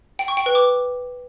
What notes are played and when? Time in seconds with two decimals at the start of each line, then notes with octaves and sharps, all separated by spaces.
0.19 G5
0.28 C#6
0.37 G5
0.46 B4
0.55 D6